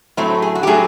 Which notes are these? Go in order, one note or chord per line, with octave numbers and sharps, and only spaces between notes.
A2 F#3 A3 C4
G#4
F#4
G4
A2 F#3 A3 G#4